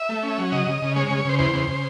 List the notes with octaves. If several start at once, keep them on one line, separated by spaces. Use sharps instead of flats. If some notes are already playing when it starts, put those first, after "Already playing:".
Already playing: E5
A3
C#4
F#3
C#3 D#5
C#3
C#3
G#3 C#5
C#5
C#3
C#5
C#3 C5
E2 C5
C#3
C#3